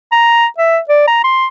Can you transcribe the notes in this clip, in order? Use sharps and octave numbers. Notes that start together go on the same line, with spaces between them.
A#5
E5
D5
A#5
C6